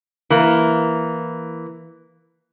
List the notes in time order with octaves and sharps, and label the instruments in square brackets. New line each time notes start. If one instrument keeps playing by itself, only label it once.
[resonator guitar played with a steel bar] E3 A#3